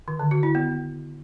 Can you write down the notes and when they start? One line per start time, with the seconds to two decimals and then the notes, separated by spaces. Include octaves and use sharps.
0.08 D#3
0.19 D3
0.31 F#4
0.43 E4
0.55 B3